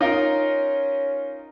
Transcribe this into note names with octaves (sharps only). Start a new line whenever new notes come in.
C#4 D#4 F4 A#4